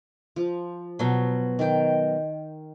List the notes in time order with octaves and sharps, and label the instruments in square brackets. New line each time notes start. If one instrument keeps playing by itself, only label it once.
[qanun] F3
[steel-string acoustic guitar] B2 F#3
[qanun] D#3 G5